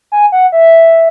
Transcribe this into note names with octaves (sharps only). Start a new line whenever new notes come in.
G#5
F#5
E5